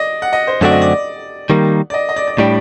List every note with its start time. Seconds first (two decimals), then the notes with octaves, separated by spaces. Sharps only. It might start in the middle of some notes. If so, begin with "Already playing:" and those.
Already playing: D5 D#5
0.22 F#5
0.33 D#5
0.47 C5
0.61 F#2 D3 A3 C4 F#4 D5
0.72 D#5
0.82 D5
1.50 D#3 G3 A#3
1.90 D5
1.94 D#5
2.09 D#5
2.16 D5
2.27 D5
2.38 A2 G3 D4 G5